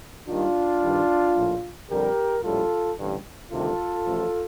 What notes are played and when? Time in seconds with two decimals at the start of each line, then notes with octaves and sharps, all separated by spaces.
0.28 D#2 D#3 G3 D4 F4
0.82 G2 D#3 G3
1.36 A#1 A2 F3
1.90 F2 D3 G3 G4 A#4
2.43 A#1 A2 G3 F4 A4
2.98 A1 G2 D3 G3
3.52 D2 C3 D#3 G3 F4 A4
4.05 A1 A2 F3